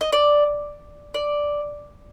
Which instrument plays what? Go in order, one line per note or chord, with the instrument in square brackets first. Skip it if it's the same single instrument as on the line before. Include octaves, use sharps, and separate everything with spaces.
[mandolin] D#5
D5
D5